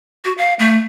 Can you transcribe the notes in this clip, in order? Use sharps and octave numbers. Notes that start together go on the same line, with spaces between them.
F#4
F5
A3